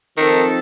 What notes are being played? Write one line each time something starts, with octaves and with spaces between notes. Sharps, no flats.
D#3 F3 C4 D#4 A4